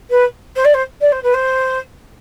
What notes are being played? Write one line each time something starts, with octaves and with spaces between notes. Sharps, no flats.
B4
C5
D5
C5
D5
C5
B4
C5